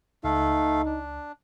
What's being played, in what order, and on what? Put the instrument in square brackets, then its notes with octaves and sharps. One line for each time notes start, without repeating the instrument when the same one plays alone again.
[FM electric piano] C#2 [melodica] A3 A4 F5 [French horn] D#4
[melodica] D4